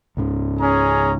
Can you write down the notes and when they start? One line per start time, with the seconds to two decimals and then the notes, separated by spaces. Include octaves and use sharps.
0.17 C#2 G#2 C#3
0.60 C#4 G#4 A#5